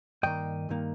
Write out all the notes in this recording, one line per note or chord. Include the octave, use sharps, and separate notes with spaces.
G2 D#3 A#3 D#5 G5
G2 D#3 A#3